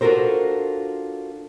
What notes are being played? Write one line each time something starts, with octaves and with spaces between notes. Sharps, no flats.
D4 F4 F#4 A4 A#4 C5